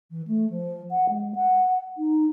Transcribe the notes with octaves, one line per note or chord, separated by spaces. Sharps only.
E3
A3
F3
F#5
G#3
F#5
D#4